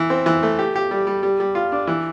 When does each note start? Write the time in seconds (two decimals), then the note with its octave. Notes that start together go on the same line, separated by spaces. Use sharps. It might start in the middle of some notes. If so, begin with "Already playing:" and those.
Already playing: E3
0.10 C4
0.26 E3
0.43 A3
0.59 G4
0.76 G4
0.91 G3
1.07 G3
1.23 G3
1.40 G3
1.55 F4
1.72 D4
1.87 E3